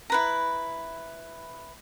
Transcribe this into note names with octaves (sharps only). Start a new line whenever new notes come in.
E4 B4 A#5